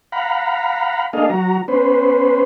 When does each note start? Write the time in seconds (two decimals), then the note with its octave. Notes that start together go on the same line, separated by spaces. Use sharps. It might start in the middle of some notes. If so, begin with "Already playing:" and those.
0.12 F5 F#5 A#5 B5
1.13 A#3 D4 G#4 A4 D#5 F5
1.30 F#3 F#4 A#5
1.68 B3 C#4 B4 C5